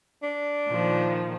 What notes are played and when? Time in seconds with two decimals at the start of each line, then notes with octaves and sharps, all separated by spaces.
0.23 D4
0.69 A#2 D#3 F3